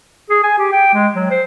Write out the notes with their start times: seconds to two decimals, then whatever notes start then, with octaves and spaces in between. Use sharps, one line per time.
0.30 G#4
0.44 G#5
0.58 G4
0.72 G5
0.93 G#3
1.15 F#3
1.30 C5